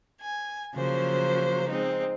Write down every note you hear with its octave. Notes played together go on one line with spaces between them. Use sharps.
G#5
C#3 F3 F#3 A#3 C5
G#3 C4 D#4